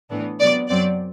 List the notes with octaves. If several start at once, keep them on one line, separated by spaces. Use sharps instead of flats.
A2 E3 B3 D4
C3 F#3 B3 D5
F#2 F#3 C4 D5